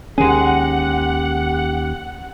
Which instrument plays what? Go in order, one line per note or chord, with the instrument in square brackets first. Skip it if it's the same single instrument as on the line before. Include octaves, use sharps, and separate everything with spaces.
[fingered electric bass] D#2 D#3 C#4 [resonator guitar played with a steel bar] G#3 G#4 [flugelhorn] G4 [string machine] F#5